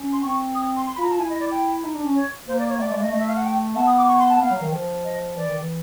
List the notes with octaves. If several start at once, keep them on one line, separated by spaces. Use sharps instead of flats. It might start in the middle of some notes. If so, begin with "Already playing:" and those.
Already playing: C#4
C6
C4 C#6
D#6
C6
C6
B5
F4
A#5
F4 A5
E4 G#5
D#5
D5
G5
D#4
D4
C#4
C#5
A#3 C5
D5
C#5
A3 D5
G#3 D5
A3 D#5
A3 D#5
E5
F5
F#5
G5
B3 A5
D#6
D6
C#6
C6
A5
B3 F5
F#3
D#3
F3
D#5
E3 D5
D#3
E3